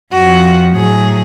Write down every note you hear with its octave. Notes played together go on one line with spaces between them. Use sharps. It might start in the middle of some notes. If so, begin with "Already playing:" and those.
F2 F3 F#4
A2 F#3 G#4